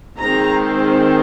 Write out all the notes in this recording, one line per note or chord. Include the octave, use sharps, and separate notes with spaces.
D#3 G#3 C4 A#5